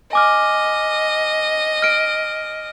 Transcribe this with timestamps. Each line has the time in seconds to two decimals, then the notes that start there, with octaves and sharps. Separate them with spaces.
0.13 D#5 G#5 D6 F6
1.82 F6 D7